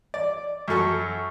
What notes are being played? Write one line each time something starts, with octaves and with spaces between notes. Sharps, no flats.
D5
F#2 F#3 A4 C#6